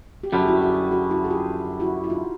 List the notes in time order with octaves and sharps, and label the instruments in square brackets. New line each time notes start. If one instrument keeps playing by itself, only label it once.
[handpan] G4
[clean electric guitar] F#2 D3 G3 [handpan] F#4 G#4
[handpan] G4
E4 F#4
F#4 G#4
F#4 G#4
E4 F#4
G#4
F4 G4
E4 F#4
E4
D#4 F4